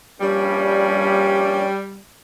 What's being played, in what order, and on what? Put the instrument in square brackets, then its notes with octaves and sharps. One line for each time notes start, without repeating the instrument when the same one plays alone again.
[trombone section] A#1 G2 C#4 [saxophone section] G3